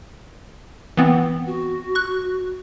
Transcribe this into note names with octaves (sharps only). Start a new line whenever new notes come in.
E3 B3 C4
F#4
C#6 F#6